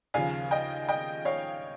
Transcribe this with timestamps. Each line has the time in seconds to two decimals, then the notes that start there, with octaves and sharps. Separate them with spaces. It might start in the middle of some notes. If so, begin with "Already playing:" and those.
0.14 D#2 C#3 F3 F5 G#5
0.51 D#5 G5
0.88 D#5 G5
1.25 C#5 F5